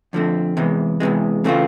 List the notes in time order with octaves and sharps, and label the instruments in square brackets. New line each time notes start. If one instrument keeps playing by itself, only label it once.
[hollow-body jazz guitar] F2 D3 F3 A3 C4
E2 C3 E3 G#3
E2 C3 E3 G#3
C#3 E3 A3 C4 F4